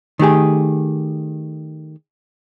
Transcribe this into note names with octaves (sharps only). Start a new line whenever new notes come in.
D#3 A3 G4 G#4